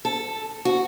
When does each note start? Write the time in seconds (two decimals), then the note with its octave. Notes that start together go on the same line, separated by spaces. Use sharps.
0.05 A4
0.65 F#4